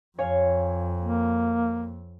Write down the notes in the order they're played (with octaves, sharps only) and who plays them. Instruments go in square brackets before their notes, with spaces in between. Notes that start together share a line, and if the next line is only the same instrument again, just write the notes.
[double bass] F2 [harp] C#5 F5 G#5
[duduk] A#3